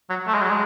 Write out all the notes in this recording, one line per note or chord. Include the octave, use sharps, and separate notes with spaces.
F#3
A3
G#3
F#3
G#3